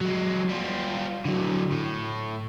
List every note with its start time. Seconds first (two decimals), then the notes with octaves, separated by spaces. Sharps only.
0.01 F#3 G#3
0.49 G3 F4
1.25 D3 F#3
1.72 A2